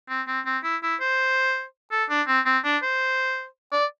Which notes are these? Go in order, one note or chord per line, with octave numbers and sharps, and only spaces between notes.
C4
C4
C4
E4
E4
C5
A4
D4
C4
C4
D4
C5
D5